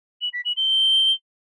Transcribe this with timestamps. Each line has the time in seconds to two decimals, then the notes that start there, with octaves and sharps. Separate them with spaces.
0.22 F#7
0.33 B6
0.45 F#7
0.57 G7